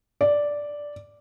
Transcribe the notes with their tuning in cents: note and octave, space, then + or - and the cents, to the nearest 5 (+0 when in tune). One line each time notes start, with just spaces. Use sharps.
D5 -5